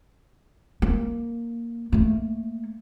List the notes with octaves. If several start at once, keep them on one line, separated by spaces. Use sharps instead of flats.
A#3
A3 A#3